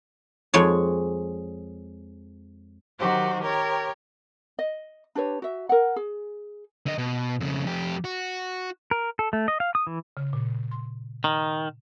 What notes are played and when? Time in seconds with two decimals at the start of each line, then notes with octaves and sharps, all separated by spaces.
0.54 F2 G#3 C#5
2.99 D#3 F#3 F#4 G4 C5
3.41 G4 A#4 C#5 G5
4.59 D#5
5.15 D4 G4 B4 C#5
5.42 F#4 E5
5.69 A#4 F#5
5.96 G#4
6.86 D3 D#5
6.98 B2
7.40 F2 C#3
7.65 F2 G4
8.04 F#4
8.91 A#4
9.19 A4
9.33 A3
9.48 D#5
9.60 F5
9.75 D#6
9.87 E3
10.17 C#3
10.33 A#2
10.71 C6
11.24 D#3